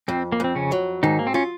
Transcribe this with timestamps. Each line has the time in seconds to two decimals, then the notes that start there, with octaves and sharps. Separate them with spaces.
0.08 F2 C4
0.32 A#3
0.40 F2 C4
0.56 C#3 C#4
0.72 F#3
1.03 G#2 D#3 D#4
1.19 A#3
1.27 C4
1.34 C#4 F4